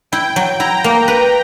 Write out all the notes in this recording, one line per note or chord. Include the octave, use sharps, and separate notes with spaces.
E4 G5
F#3
E4 A#5
A#3
B4